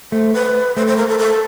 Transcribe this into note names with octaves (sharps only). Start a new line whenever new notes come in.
A3 C5
B4
A3 C5
C5
A#4
A4
A4